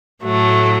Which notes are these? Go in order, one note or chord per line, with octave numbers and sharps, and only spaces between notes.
A2 F#3 A3